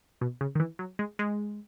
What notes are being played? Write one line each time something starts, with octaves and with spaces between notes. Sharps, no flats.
B2
C#3
D#3
E3
F#3
G#3
G#3